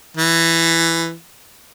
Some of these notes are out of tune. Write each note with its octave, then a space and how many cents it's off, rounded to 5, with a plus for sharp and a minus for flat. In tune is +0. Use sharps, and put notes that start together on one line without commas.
E3 +10